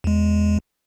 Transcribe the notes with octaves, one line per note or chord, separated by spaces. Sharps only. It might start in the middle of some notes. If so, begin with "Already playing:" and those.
E2 G#3